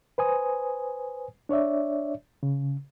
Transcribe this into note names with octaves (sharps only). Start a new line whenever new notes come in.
B4 C5 G#5 D#6
D4 C#5 D5 E5
C#3